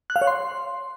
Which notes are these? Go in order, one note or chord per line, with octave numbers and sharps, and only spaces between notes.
F#6
F5
C#5
C6